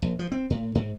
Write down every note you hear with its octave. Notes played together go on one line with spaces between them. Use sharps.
A#1
F3
C4
A2
G#2